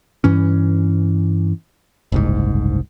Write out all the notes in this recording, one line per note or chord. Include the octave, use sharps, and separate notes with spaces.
G2 E3 C#4
F#1 C2 G#2